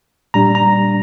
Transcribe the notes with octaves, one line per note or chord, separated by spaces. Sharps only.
A#2 G3 D4 A#5
A#5